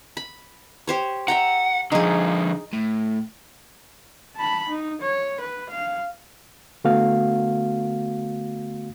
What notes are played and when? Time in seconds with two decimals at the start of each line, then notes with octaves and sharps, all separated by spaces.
0.17 B5
0.87 G4 C5 C#5
1.28 E5 F#5 G5 A#5
1.92 D3 F3 D#4 G#4
2.73 A2
4.36 A5 B5
4.69 D#4
5.02 C#5
5.41 B4
5.70 F5
6.84 D3 A3 B3 F#4 F5